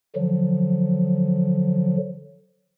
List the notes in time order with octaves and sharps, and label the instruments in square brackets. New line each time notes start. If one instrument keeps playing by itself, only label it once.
[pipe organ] D3 F3 F#3